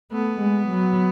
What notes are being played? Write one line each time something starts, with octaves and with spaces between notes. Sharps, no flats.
A3 B3
G#3
F#3